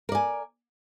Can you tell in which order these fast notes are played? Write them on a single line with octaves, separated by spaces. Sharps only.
A#4 D5 G#5